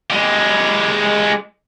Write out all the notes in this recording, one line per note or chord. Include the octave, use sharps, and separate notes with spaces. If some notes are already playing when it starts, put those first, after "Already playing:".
G#3 G4